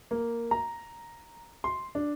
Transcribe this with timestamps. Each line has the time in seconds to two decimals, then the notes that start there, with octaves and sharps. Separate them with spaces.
0.11 A#3
0.51 A#5
1.64 C6
1.95 D4